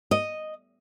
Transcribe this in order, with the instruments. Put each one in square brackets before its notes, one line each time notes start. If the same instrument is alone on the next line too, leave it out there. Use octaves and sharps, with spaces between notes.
[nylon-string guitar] D#5